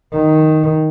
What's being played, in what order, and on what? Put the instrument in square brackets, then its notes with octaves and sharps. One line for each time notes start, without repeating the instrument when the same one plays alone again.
[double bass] D#3